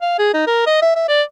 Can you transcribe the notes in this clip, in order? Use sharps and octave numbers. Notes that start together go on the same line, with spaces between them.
F5
G#4
D#4
A#4
D#5
E5
E5
D5